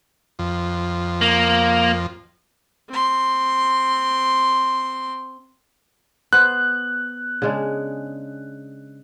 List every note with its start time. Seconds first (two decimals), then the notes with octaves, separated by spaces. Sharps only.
0.39 F2
1.21 A#3
2.89 C4 C6
6.33 B3 C5 F#6
7.42 C#3 G#3 D4